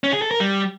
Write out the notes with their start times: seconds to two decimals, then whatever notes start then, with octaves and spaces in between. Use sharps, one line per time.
0.04 C#4
0.13 G#4
0.22 A4
0.31 A#4
0.40 G3